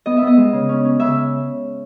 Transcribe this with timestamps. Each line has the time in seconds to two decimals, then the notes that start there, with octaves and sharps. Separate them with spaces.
0.06 B3 D#5
0.17 E5
0.22 B3
0.27 D#5
0.37 G#3
0.53 C#3
0.69 C#4
0.85 C#4
1.00 C#3 E5